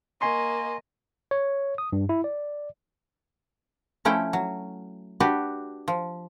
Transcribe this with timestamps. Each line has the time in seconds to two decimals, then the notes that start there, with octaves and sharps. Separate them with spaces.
0.21 A#3 D#5 G#5 C6 C#6
1.31 C#5
1.78 D#6
1.93 G2
2.09 E4
2.24 D5
4.05 F3 A3 C#4 E4 G5
4.33 F#3
5.20 D4 F#4 G4 B4
5.88 F3